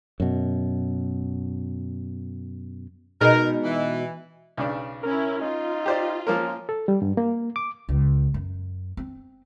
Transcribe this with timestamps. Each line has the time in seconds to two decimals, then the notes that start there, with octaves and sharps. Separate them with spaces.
0.20 F#2 B2
3.21 B2 G#3 D#4 A#4
3.64 E3
4.57 B1 C#3 D4
5.03 C#4 E4 A#4
5.42 D#4 F4
5.86 G4 C5 D5
6.27 F3 A#3 C#4 A#4
6.69 A4
6.88 G3
7.02 G2
7.17 A#3
7.56 D6
7.89 C#2
8.34 F#2
8.97 C4